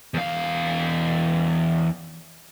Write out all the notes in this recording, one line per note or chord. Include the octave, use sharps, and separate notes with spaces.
E2 F5